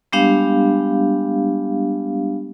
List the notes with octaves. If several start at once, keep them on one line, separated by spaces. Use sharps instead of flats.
G3 G#3 B3 D4 G4 F5